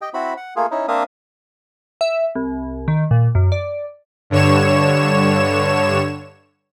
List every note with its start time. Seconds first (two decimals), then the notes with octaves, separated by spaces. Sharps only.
0.02 G4 D#5 G5
0.14 C4 E4 F#4 B5
0.37 F#5
0.56 A3 A#3 F4 G#4
0.71 C#4 D#4 E4
0.88 A#3 C4 D4 E5 F5 D#6
2.01 E5
2.35 C2
2.88 D#3
3.11 A#2
3.35 F#2
3.52 D5
4.30 G2 D3 C#5 E7